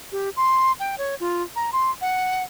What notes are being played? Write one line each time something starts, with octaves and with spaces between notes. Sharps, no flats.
G4
C6
G5
C#5
F4
A#5
C6
F#5